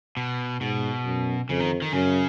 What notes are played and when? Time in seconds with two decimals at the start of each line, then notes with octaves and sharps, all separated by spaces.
0.17 B2
0.61 G#2 B2
1.05 F#2
1.49 F2 C#3
1.60 D#3
1.82 D#3
1.93 F#2 C#3